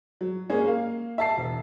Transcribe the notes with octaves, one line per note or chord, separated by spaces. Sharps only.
F#3
G#3 A#3 C#4 G#4
A#3 F5
E5 A5 C7
E1